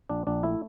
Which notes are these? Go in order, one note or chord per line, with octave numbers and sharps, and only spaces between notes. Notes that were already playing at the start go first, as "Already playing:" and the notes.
A#1 D4
A#1 D4
A3 E4